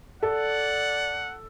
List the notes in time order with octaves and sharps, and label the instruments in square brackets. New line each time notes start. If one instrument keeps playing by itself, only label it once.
[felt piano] A4 [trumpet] D5 [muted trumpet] F#5